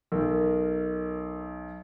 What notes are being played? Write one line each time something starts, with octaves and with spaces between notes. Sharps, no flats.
B1 A#4